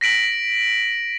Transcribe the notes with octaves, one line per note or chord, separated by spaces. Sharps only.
A#6 B6 D7 F#7